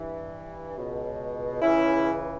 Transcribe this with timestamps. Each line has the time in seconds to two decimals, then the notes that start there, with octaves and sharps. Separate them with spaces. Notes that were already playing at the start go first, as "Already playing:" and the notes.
Already playing: G2 E3
0.76 C#2 B2
1.62 C#2 C#3 E3 C#4 E4